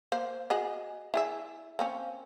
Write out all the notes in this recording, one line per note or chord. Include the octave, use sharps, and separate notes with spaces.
A#3 C5
F#4 G#4 D#5
E4 G#4 E5
A#3 C4 C#4